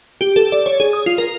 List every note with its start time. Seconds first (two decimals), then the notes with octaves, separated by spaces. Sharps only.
0.21 G4
0.36 A4
0.52 D5
0.66 C#5
0.80 G#4
0.93 D#6
1.06 F4
1.18 A#4